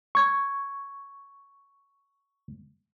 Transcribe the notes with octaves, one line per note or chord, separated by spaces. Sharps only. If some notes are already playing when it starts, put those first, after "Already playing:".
C#6 G#6